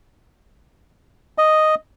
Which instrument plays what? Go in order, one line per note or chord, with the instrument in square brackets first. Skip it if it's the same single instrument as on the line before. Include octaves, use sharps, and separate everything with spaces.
[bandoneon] D#5